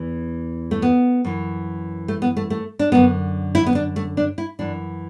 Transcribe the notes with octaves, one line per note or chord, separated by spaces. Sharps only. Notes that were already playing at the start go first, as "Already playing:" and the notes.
Already playing: E2 E3
A3
B3
F#2 E3
A3
B3
A3
A3
D4
F#2 D3 B3
E4
B3
D4
A3
D4
E4
F#2 E3 D4